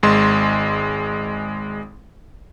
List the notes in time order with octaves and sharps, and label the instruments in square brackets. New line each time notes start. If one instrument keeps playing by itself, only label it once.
[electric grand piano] G#1 G#3 C6